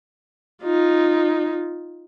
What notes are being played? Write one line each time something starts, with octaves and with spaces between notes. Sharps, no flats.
D#4 F4